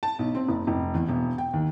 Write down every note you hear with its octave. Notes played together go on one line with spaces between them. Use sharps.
A5
B1
C4
F#1
F1
E2
E1
G5
D#2